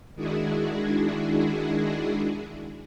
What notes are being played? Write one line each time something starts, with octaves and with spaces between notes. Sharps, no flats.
D#3 G#3 D4 E4 F#4 G#4